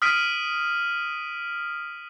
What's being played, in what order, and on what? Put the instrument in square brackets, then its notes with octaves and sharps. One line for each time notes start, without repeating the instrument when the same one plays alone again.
[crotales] D#6 F6 B6 D7 D#7